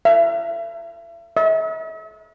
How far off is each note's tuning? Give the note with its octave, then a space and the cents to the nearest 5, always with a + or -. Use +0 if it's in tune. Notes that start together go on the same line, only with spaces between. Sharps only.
E5 +35
E5 -40